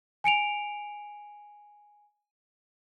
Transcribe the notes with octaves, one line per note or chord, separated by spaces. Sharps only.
G#5 C#7 D7 F7